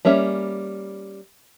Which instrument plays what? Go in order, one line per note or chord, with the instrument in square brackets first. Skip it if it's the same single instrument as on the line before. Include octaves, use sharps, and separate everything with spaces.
[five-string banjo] G3 A#3 C#4 E5